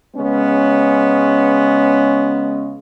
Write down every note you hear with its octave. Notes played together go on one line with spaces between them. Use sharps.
C#3 G#3 B3 C#4